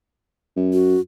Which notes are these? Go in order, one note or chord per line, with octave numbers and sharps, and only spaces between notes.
F#2
F#4